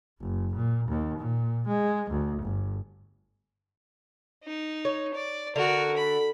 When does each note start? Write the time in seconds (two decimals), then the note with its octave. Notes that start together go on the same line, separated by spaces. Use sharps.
0.21 F#1
0.56 A#2
0.89 D#2
1.19 A#2
1.68 G#3
2.11 D2
2.43 G1
4.44 D#4
4.85 C#5
5.14 D5
5.56 D3 F#4 A#4
5.97 B5